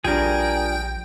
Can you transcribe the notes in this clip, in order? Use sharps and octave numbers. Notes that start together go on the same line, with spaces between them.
A#1 F3 G3 D4 G#4 A#4 G5